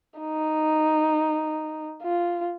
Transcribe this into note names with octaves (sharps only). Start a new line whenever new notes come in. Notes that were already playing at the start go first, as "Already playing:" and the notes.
D#4
F4